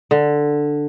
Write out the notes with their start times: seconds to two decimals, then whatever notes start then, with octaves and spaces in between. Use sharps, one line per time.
0.11 D3